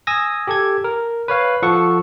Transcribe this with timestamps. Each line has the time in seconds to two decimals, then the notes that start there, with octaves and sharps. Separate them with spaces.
0.07 G#5 D#6 E6 G#6 A#6
0.47 G4 A4 G#6
0.84 A#4
1.28 B4 C#5 F5
1.62 F3 A4 F#5 C#6